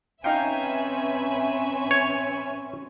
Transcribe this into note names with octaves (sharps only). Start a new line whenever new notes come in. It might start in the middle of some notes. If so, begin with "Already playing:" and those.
C4 C#4 D#4 B4 E5 F5 G5 G#5
C#5